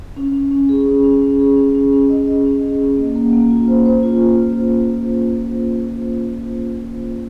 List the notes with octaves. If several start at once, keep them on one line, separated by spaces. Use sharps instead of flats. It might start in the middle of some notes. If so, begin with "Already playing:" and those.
C#4
C#4
C#4
G#4
C#4
C#4
C#4
G#4
C#4
C#4
C#4
D#5
D#5
C#4
G#4
C#4
A#3
A#3
A#3
F4
C5
C5
F4
F4